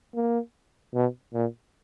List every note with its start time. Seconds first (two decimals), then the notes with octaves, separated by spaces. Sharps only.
0.15 A#3
0.94 B2
1.33 A#2